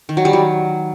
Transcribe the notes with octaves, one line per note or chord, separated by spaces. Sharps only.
D#3
F#3
G3
F#3